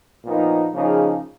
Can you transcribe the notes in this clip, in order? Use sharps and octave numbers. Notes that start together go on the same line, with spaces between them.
A#2 F3 B3 D#4 A#4
C#3 F3 A#3 D#4 G#4